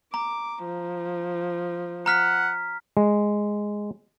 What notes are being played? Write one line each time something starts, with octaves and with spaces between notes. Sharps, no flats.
A#5 D6
F3
F#5 A#5 F6 B6
G#3